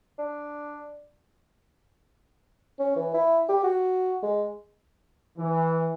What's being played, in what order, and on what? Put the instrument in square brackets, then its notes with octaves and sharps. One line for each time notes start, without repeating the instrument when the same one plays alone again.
[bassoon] D4
C#4
E3
E4
G4
F#4
G#3
[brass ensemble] E3